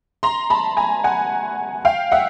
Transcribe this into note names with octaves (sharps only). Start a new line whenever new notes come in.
A#5 C6
A5 B5
G#5 A#5
F#5 G#5
F5 G5
E5 F#5